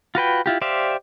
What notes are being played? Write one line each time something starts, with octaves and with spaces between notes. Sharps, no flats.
F4 F#4 B4 G5
E4 F4 G4
G4 C5 D5 E5 F5